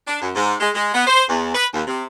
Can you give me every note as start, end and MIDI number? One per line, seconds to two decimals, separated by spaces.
0.08 0.21 62
0.22 0.31 42
0.35 0.54 44
0.60 0.70 56
0.75 0.92 56
0.94 1.06 59
1.07 1.24 72
1.29 1.54 40
1.55 1.66 71
1.74 1.83 39
1.87 2.05 48